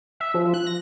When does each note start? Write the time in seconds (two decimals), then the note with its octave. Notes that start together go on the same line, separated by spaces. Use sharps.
0.20 E5
0.34 F3
0.54 F#6
0.67 A#6